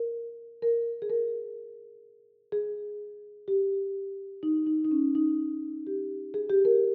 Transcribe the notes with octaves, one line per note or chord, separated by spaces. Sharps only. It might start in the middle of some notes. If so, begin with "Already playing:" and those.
Already playing: A#4
A#4
G#4
A#4
G#4
G4
D#4
D#4
D#4
C#4
D#4
G4
G#4
G4
A#4